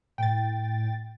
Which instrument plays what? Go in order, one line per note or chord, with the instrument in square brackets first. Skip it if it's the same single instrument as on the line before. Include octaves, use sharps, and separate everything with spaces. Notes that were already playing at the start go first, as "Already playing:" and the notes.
[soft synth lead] A2 [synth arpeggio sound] G5 A6